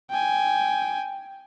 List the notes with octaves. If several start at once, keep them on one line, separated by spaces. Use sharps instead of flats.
G5 G#5